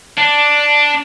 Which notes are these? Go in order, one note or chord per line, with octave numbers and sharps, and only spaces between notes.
D4